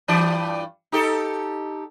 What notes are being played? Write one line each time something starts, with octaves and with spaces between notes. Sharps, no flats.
G2 E3 D5
D#4 G4 A4